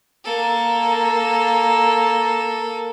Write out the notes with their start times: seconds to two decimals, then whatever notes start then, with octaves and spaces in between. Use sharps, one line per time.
0.25 A#3 A4